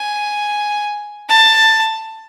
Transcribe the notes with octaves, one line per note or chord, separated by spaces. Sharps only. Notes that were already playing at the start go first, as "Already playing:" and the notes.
Already playing: G#5
A5